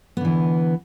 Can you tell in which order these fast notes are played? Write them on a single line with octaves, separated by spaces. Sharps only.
B3 D3 E3